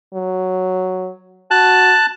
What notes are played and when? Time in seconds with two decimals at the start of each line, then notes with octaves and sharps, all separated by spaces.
0.14 F#3
1.51 F#4 A5 F#6